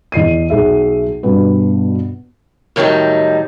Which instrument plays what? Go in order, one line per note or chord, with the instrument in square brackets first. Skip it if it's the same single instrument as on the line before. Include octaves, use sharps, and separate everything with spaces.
[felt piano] E2 D#5 C7 D#7
B1 G#4 E5
G2 B2 B3 B4
[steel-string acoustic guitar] A2 D#3 F#3 G3 D#4